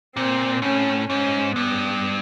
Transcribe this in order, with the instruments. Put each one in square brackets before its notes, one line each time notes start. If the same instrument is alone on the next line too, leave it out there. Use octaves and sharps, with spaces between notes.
[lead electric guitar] A#2 [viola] C4
[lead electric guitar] A2 [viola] C#4
[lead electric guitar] G#2 [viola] C#4
[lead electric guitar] G2 [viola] B3